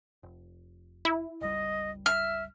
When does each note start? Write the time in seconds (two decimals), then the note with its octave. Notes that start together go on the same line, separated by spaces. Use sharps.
0.23 F1
1.05 E4
1.41 G1 C#2 G3 D#5
2.06 E5 F6